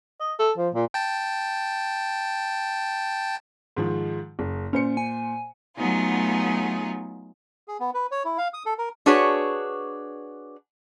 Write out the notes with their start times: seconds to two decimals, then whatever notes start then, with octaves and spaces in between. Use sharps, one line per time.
0.20 D#5
0.39 A4
0.57 F3
0.74 A#2
0.94 G5 A5
3.76 G#2 D#3 F3
4.39 F#1
4.73 A#2 C#4 C5 C#7
4.97 G#5
5.77 F#3 A3 B3 D#4 F4 G#4
7.68 G#4
7.80 B3
7.94 B4
8.11 C#5
8.25 E4
8.38 F5
8.54 D#6
8.66 A4
8.78 A#4
9.06 D4 F#4 G#4 B4 C#5